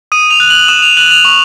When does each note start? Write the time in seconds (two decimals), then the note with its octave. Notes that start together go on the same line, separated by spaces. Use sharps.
0.12 D#6 D#7
0.30 F7
0.40 F#6
0.50 F#7
0.68 D#6 E7
0.82 F7
0.97 F#6 F#7
1.11 F7
1.25 C#6